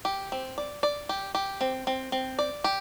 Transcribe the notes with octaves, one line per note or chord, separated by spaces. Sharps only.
G4
C4
D5
D5
G4
G4
C4
C4
C4
D5
G4